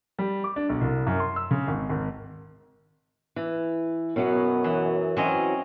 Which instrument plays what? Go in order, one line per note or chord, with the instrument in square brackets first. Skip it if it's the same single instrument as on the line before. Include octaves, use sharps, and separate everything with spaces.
[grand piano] G3
D6
D4
B1
C2
F#2
C6
E6
C#3
G#1
G#1
[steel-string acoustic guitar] E3
[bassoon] F#2 [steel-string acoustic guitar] B2 F#3 B3
[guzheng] E3
[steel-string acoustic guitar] E3 F#3 [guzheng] C4 C#4 D#5